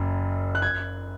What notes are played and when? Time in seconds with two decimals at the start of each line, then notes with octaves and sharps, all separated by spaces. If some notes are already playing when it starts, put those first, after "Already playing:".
Already playing: F#1 F#2
0.55 F#6
0.62 G#6